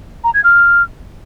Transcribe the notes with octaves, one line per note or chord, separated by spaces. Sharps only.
A#5
G#6
F6